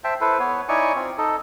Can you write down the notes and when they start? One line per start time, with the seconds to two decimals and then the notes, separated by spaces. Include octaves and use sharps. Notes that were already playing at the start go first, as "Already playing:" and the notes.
0.04 C5 E5 G5 A5
0.21 E4 A4 B4 C5
0.39 B3 B4 C#5
0.68 D#4 E4 C#5 D5 G#5 C#6
0.96 C4 F4
1.18 D#4 A4